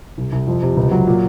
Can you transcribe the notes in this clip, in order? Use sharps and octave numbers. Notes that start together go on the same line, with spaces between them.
C2
C2
F2
C3
C#2
F#3
A#2